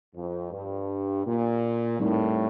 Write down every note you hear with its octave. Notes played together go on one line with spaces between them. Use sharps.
F2
G2
A#2
A2 G3 C4 D#4 A#4 D5